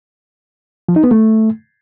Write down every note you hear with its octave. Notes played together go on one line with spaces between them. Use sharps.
F3
D#4
B3
A3